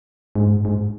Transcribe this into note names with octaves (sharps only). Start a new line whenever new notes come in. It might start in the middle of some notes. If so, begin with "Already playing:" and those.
G#2
G#2